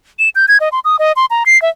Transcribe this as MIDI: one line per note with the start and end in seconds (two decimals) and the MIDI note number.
0.19 0.29 100
0.35 0.46 91
0.48 0.57 92
0.60 0.69 75
0.72 0.80 84
0.85 0.96 87
0.99 1.12 75
1.16 1.26 84
1.31 1.44 82
1.46 1.60 96
1.62 1.69 76